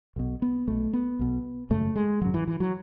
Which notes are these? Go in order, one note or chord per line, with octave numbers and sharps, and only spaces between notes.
B1 B2
B3
B1 B2 A3
B3
B1 B2
G#1 F#2 C#3 A3
G#3
G#1 F#2 C#3 F#3
E3
E3
F#3